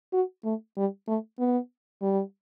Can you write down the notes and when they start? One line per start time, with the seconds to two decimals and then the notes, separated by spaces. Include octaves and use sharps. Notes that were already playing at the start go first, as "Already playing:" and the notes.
0.13 F#4
0.44 A3
0.77 G3
1.07 A3
1.39 B3
2.02 G3